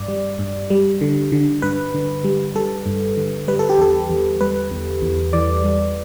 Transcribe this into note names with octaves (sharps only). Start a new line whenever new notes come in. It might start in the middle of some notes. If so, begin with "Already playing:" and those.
Already playing: G2 D5
G3
G2
G3
D3
D3
G2 B4
D3
G3
G3 A4
G2
D3
G3 B4
A4
G4
E2 A4
E2
G3 B4
E2
E2
E3 D5
G3